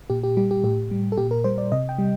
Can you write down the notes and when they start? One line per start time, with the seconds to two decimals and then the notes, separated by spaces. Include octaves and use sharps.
0.10 A#2 G4
0.23 G4
0.37 G3 G4
0.51 G4
0.63 A2 G4
0.91 G3
1.12 A4
1.17 A#2 G4
1.31 A#4
1.44 G3 C5
1.58 D5
1.72 C3 D#5
1.89 G5
1.98 G3